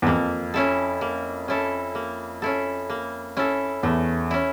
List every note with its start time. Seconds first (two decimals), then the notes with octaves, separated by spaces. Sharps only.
0.02 E2
0.06 F2 A#3
0.54 C#4 E4 A4
1.01 A#3
1.48 C#4 E4 A4
1.95 A#3
2.42 C#4 E4 A4
2.90 A#3
3.37 C#4 E4 A4
3.83 E2 A3
4.31 C#4 E4